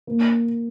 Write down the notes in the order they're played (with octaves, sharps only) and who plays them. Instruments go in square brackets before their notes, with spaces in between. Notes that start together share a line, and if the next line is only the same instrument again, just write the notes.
[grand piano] A#3